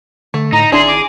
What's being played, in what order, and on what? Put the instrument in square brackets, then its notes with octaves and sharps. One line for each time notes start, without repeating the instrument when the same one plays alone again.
[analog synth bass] D3 [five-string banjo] A3
[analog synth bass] A2 [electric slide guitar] D#4 [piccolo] A#5
[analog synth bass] G#1 [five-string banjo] D4 E4 A5 [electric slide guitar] G#4 [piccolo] C6
[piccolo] D6